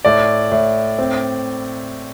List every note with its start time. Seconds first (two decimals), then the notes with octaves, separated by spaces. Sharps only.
0.05 A2 D5
0.52 A2
0.99 C4